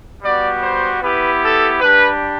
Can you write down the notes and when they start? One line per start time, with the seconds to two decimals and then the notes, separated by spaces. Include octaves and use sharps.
0.23 G3 B3 F#4 D5
0.62 C5
1.01 B3 E4 G4 B4
1.42 A4
1.81 G3 D4 G4 B4